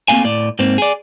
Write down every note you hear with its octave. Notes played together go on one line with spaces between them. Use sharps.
A3 A#3 C4 F5 G#5
A2 D5
G#2 A#3 C4
G#4 D5